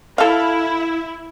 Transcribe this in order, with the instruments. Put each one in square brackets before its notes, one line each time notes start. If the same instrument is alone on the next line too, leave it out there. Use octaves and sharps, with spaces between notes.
[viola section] E4 [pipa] A4 F5